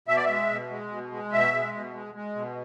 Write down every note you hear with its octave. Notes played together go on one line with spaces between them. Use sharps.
B2 E5
D5
G#3 E5
B2
G#3
B2
G#3
B2 E5
G#3
B2
G#3
G#3
B2